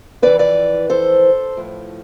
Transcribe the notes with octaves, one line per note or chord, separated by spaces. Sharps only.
F2 E3 B4 D5
B4 D5
A4 C5
A2 F3